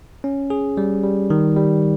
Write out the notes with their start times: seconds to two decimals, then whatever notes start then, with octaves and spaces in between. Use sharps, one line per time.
0.24 C#4
0.50 G#4
0.77 G3
1.04 G3
1.30 D#3
1.56 G3